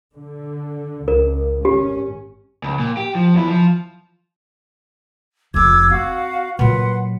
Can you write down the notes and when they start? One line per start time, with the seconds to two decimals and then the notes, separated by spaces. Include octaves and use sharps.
0.14 D3
1.08 C#2 A#4
1.65 G#1 C#4 G4
2.63 C#2
2.80 A#2
2.97 G4
3.15 F3
3.34 E2 E4
3.48 F3
5.54 F1 F2 D6 E6 G#6
5.90 C4 F#4 F5
6.59 A#2 F#3 B4 F#5 C6